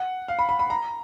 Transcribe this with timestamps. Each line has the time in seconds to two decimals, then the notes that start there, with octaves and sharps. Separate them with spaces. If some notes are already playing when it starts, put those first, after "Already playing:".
Already playing: F#5
0.28 F5
0.39 B5
0.49 B5
0.59 B5
0.70 A#5